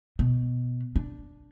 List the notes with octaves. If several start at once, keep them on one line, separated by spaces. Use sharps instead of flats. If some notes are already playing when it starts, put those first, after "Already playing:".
B2
D4